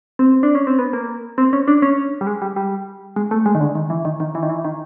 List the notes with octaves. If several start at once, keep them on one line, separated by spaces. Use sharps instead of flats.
C4
D4
C#4
C4
B3
A#3
C4
C#4
D4
C#4
G3
G#3
G3
G3
G#3
A3
G#3
D#3
D3
D#3
E3
D#3
D#3
E3
D#3
E3
D#3